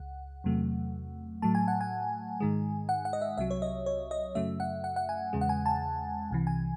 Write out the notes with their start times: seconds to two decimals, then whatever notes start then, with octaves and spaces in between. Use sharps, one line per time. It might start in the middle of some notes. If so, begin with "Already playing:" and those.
Already playing: C#2 F#5
0.44 E2 C3 F#3 A3
1.42 A2 F#3 A3 A5
1.55 G#5
1.68 F#5
1.81 G#5
2.40 G#2 D#3 G#3
2.89 F#5
3.05 F#5
3.13 D#5
3.21 E5
3.37 C2 C3 F#3 E5
3.51 C#5
3.62 D#5
3.86 C#5
4.11 D#5
4.35 F#2 C#3 F#3 A3 E5
4.60 F#5
4.84 F#5
4.96 F#5
5.09 G#5
5.33 E2 C#3 G#3
5.41 F#5
5.49 G#5
5.66 A5
6.31 C2 C3 E3
6.47 G#5